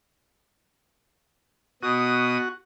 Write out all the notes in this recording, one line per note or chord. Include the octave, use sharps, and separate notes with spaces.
B2 F#4 D#6